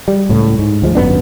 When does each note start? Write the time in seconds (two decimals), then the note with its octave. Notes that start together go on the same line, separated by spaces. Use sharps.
0.08 G3
0.29 C#2 A2
0.59 G#2
0.82 D2 F3 G3 G#3
0.95 G#1 F#2 B3 D4